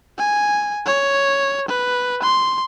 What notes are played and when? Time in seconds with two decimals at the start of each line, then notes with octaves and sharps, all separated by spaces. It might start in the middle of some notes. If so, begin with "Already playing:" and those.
0.18 G#5
0.86 C#5
1.68 B4
2.22 C6